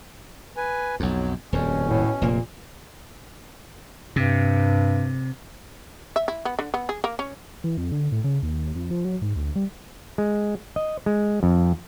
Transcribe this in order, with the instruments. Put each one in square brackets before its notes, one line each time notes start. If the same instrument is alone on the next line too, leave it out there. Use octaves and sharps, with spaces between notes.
[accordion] B4 G#5
[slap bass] B1 F2 [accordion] F#3
[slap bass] D#1 F2 [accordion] B2 C#4
[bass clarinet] A2
[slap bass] F1 A#3 [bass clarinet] A#2
[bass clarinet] G2 [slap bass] C3
[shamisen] E5
E4
B3
D3
B3
G#4
A#3
C#4
[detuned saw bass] E3
F2
D3
A2
C#3
D#2
F2
F3
F#3
G#2
D2
G3
[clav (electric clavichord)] G#3
D#5
G#3
F2